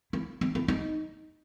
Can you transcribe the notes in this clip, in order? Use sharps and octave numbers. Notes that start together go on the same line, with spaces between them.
E4
D#4
E4
D#4